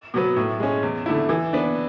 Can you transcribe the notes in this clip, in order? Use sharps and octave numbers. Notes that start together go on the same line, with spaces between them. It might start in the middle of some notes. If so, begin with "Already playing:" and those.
B2 F#3 B3
A2
G#3 C#4
E2
D3 A3 E4
E3
B3 D4